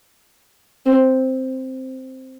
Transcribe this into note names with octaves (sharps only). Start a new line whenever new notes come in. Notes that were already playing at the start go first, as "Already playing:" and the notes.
C4